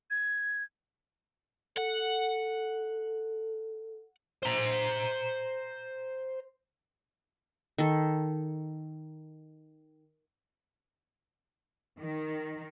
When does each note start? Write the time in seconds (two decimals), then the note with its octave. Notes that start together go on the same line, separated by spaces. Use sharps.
0.10 G#6
1.77 A4 F#5
4.43 C5 A#5
7.78 D#3 A4
11.98 D#3